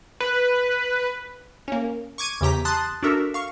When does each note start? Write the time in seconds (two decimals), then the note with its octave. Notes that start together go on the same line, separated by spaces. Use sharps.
0.20 B4
1.68 A#3 C#4
2.18 C#6 D6 G#6 D#7
2.41 E2 C#3 G4 A#5 B6
2.65 A5 C6 D#6 F#6 A6
3.03 D4 F#4 A4 A#4 E5
3.34 F5 C#6